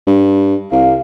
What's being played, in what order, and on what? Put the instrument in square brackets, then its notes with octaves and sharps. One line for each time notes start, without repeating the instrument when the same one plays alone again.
[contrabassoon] G2
[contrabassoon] C2 [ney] F5